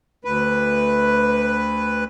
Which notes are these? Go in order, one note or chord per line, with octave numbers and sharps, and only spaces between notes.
D2 B4